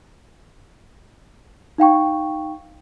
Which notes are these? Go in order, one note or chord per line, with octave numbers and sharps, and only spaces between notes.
D#4 F5 G5 C#6